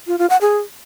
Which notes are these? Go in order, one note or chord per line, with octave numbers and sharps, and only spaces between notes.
F4
F4
F#5
G#4